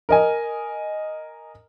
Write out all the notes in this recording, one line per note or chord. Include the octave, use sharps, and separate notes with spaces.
A#4 D#5 G#5